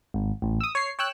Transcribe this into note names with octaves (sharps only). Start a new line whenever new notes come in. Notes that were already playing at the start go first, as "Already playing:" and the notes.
G#1
A1
D#6 E6
C#5 C7
C#5 G5 E6 F#6